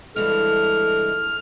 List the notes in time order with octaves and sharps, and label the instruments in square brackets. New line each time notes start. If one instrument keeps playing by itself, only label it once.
[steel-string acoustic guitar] G2 E3 G#3 [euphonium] A4 [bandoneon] F6